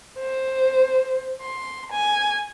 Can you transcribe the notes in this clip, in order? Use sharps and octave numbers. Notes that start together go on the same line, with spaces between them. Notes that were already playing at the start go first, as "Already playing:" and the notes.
C5
C6
G#5